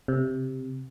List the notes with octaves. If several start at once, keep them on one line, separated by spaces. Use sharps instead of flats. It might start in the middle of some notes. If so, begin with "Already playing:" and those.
C3